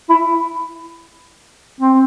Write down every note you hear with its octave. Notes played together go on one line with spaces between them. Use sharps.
E4
C4